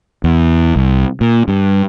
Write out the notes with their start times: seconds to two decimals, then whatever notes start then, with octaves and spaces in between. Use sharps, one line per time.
0.24 E2
0.76 C2
1.21 A#2
1.48 G2